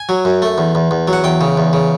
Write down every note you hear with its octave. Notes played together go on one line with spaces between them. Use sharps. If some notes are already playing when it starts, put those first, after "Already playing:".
Already playing: G#5
F#3
F#2
A3
E2
E2
E2
F#3
F#5
E2 G5
C#3
E2
C#3